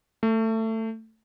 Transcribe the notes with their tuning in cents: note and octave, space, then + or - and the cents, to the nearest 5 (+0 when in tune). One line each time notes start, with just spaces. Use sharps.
A3 +20